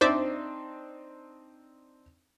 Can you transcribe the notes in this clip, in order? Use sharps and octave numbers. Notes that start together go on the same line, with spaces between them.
C4 D4 D#4 C5 D5 E5